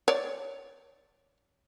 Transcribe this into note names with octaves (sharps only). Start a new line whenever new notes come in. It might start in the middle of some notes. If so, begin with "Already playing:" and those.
C#5 D5